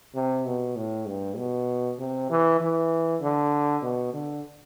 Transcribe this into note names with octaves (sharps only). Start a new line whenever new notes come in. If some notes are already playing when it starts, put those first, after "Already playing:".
C3
B2
A2
G2
B2
C3
E3
E3
D3
B2
D3